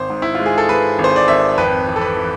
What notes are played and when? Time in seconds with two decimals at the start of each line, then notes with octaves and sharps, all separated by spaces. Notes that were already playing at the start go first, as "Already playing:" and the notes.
Already playing: G#1 C5
0.10 G#2
0.22 E4
0.35 G#3 F4
0.46 G#4
0.58 A4
0.69 G#3 B4
0.99 G#1
1.04 C5
1.16 D5
1.28 G#1 E5
1.58 F2 B4
1.87 E3
1.96 A4
2.01 B4
2.16 E3